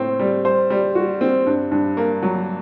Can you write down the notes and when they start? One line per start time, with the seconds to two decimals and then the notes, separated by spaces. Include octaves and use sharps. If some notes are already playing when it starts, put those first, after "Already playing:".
Already playing: A2 C4
0.19 G3
0.45 C5
0.70 G3
0.95 F#4
1.21 C4
1.46 G2
1.71 G2
1.97 A#3
2.22 F#3